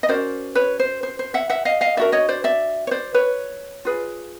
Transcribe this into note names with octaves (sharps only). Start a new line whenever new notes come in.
D#5
C#4 F#4 A#4 C5 D5
B4 C#5
C5
C5
C5
E5 F#5
E5 F#5
D#5 F5
D#5 F5
D4 F#4 A#4 D5 E5
C#5 D#5
C5 D5
D5 E5
C#5
C5 D5
B4 C#5
F4 G#4 B4